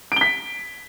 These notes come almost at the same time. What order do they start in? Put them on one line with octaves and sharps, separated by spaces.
D7 G7 B6